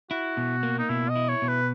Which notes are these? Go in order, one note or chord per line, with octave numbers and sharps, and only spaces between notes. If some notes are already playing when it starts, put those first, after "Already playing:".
E4 F#4
B2
A#3
D#4
B2 E4
D#5
E4
C#5
B2
B4